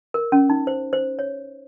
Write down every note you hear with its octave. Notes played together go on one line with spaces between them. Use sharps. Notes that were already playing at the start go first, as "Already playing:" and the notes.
A#4
C#4
D#4
C5
C5
C#5